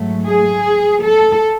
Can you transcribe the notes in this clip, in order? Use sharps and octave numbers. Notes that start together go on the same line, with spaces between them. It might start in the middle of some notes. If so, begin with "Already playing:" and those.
Already playing: G#2 F#3 A3
G#4
A4